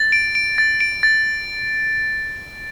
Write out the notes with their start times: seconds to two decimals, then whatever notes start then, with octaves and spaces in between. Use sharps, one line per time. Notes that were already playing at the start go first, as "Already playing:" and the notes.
Already playing: A6
0.12 D7
0.35 D7
0.58 A6
0.80 D7
1.03 A6